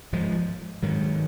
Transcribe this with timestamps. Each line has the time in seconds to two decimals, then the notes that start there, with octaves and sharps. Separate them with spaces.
0.13 G#2 F3 G#3
0.83 G#2 D#3 F#3